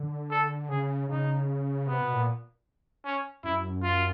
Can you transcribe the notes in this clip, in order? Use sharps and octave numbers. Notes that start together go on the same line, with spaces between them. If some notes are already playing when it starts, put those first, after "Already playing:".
Already playing: D3
A4
C#3 G#4
C#3 D#4
C3 B3
B2
A#2
C#4
F#2 E4
F4